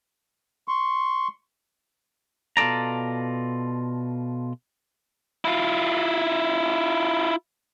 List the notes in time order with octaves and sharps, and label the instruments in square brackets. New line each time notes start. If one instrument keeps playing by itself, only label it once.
[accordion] C6 C#6
[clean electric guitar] B2 F4 A4 D5 A#5
[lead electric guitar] E4 F4